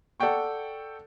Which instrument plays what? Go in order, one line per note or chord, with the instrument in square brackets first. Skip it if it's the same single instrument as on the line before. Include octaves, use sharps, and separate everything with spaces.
[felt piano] A4 D5 F#5 G5 C#6